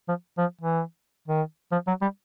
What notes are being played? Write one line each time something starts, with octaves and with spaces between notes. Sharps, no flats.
F3
F3
E3
D#3
F3
F#3
G3